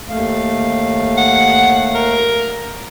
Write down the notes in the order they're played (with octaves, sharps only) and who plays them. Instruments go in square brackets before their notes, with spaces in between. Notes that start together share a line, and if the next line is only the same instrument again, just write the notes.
[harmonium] D#2 A3 F5
[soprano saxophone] F#5
A#4